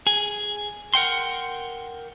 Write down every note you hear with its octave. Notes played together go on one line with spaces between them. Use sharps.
G#4
A#4 F#5 G5 C6